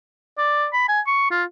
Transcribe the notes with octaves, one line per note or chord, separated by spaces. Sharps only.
D5
B5
G#5
C#6
F4